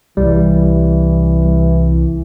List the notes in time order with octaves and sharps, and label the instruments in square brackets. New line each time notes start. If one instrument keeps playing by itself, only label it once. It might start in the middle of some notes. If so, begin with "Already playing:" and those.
[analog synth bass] C2 [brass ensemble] E3 [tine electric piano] G3